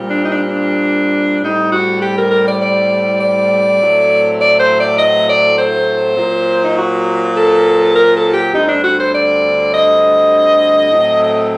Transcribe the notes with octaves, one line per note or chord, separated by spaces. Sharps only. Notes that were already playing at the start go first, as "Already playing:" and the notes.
Already playing: A#2 G3 C4
D4
D#4
D4
D4
A2 G3 C4 D#4
F#4
G4
A#4
A#4
D5
D5
D5
A2 F#3 A3 C4
D5
C5
D5
D#5
D5
C5
A#2 F#3 C4
D#4
F#4
A4
A#4
A4
G4
D2 D3 G3 C4 D#4
D4
F#4
C5
D5
D#5
A2 F#3 A3 C4